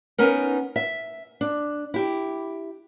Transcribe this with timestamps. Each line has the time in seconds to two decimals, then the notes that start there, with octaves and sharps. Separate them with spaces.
0.18 B3 C#4 D#4 A#4
0.76 E5
1.41 D4
1.94 E4 G4